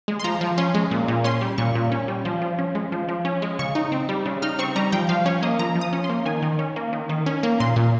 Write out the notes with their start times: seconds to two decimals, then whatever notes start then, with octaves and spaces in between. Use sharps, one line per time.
0.08 G#3
0.19 C6
0.24 F3 A#5
0.41 F3
0.58 C#4 C6
0.75 G#3
0.91 A#2
1.08 A#2
1.24 C#4 C6
1.41 G3
1.58 A#2 C#6
1.75 A#2
1.92 C#4
2.08 G3
2.25 F3
2.42 F3
2.59 C#4
2.75 G#3
2.92 F3
3.09 F3
3.25 C#4
3.42 G#3
3.59 C#3 C#6
3.75 D#4
3.92 C4
4.09 G3
4.26 C#3
4.42 D#4 F6
4.59 C4 C#6
4.76 G3 A#5
4.92 F3 G5
5.09 F3 F5
5.26 C#4 C#5
5.43 A#3 D#5
5.59 F3 A#5
5.76 F3
5.81 D#6
5.93 C#4
6.04 C6
6.10 A#3
6.26 D#3 G#5
6.42 D#3
6.59 C#4
6.76 A#3
6.93 D#3
7.09 D#3
7.26 C#4
7.43 A#3
7.60 A#2 C6
7.76 A#2